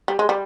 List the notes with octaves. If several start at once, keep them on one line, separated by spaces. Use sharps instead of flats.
G3
G#3
G3